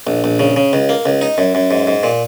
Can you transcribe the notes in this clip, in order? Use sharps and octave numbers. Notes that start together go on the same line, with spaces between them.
A#1
A#1
C#3
C#3
C#2
A#3
C#2
D#4
F#2
F#2
G#2
G#2
A#2